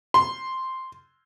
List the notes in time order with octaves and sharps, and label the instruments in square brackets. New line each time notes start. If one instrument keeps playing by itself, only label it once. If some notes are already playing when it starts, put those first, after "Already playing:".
[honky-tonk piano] C6